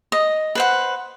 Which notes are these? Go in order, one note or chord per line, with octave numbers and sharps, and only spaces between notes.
D#5
B4 C5 F#5